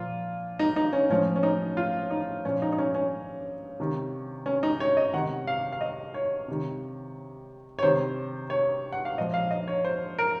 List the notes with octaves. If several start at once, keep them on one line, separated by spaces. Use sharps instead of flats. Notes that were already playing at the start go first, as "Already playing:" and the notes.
Already playing: A#2 F3 F4
D#4
D#4
C#4
A2 F3 C#4
C#4
D#4
F4
D#4
A#2 F3 C#4
D#4
D#4
C#4
C#4
C3 D#3
C#4
D#4
C#5
D#5
C3 D#3 F#5
F5
F5
D#5
C#5
C3 D#3
C#5
C3 D#3 C5
C#5
F#5
F5
A#2 F3 D#5
F5
D#5
C#5
C5
A#4